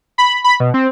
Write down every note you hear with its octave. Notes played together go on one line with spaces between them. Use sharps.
B5
B5
B2
C4